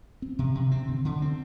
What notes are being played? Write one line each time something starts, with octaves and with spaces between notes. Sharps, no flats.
C4
C3
C3
C4
D3
D3
C4